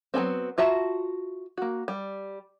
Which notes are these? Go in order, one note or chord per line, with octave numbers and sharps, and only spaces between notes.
F#3 G3 B3 C4
F4 F#4 E5 A5 A#5
A#3 F#4
G3